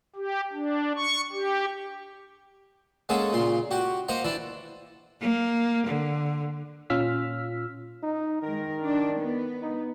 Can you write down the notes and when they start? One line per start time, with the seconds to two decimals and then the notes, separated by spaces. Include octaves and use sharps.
0.16 G4
0.53 D4
0.96 C#6
1.33 G4
3.09 G#3 A#3 C#4 G#4 A4 F#5
3.33 A#2 C#3 C6
3.71 F#4 G4 F#5
4.08 A#3 C5 D#5 F#5 A#5
4.24 E3 D4 E4 D5
5.20 A#3
5.86 D3
6.90 A#2 C#4 F4 E6 F6 B6
8.03 D#4
8.42 D#3 G#3 A#4
8.80 D4
9.19 B3
9.62 D#4